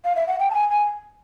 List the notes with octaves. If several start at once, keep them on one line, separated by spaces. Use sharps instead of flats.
F5
E5
F#5
G5
A5
G#5
G#5